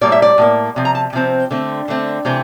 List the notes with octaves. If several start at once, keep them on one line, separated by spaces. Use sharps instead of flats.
A2 G3 A#3 D5
E5
D5
A2 G3 A#3
C3 F3
A#5
A5
C3 F3 C4
D3 A3 C4
D3 A3 C4
C3 E3 A3 C4